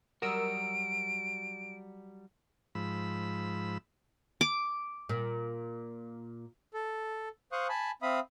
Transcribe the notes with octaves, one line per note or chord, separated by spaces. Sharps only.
F#3 G3 F#4 A#4 D#6 E6 D7
G#2 F3 B5 E6
D6
A#2
A4
C5 F5 C#6 D#6 F#6
G#5 A5 B5
C4 E5 F5 B5 D#6